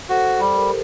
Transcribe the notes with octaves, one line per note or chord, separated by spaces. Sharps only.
F#4 A4 C5
G3
G4 A#4